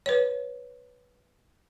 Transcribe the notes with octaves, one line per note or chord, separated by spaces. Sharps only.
B4 C#5